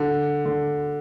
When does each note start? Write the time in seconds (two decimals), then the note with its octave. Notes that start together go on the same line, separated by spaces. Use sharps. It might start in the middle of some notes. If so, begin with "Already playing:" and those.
Already playing: D3
0.46 D3